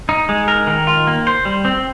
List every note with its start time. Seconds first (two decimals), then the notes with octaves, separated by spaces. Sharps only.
0.09 D#4
0.29 G#3
0.48 A#4
0.67 D#3
0.87 F4
1.07 A#3
1.27 C5
1.45 G3
1.65 C4